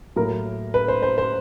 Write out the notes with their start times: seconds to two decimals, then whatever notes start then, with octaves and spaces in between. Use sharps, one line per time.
0.16 A2 F#3 A#3 A#4
0.74 B4
0.88 C5
1.03 C5
1.18 C5